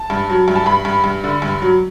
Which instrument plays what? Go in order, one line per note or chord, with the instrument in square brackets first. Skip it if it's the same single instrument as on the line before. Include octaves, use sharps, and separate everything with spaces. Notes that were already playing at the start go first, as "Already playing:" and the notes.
Already playing: [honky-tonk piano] A5
G2
F#3
G2
A5
G2 B5
G2
G2
D3
G2
F#3